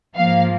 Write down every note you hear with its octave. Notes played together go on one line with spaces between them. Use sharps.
G#2 F3 A#3 F5